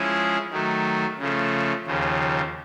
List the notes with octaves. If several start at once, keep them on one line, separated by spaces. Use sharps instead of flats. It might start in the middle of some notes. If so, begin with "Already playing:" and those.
Already playing: F3 G#3 C#4 E4 G#4
D#3 F#3 A3
C#3 F3 A3
D#2 C#3 F3